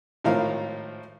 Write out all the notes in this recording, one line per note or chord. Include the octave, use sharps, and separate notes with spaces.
G#1 A2 D#3 F3 A#4 F5